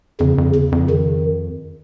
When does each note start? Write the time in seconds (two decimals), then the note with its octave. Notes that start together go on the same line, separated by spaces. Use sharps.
0.20 F2 C#3
0.38 F2
0.55 E2 C#3
0.72 F2
0.90 D#3